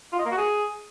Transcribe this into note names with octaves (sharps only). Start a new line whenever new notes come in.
F4
D#5
A#3
F#4
G#4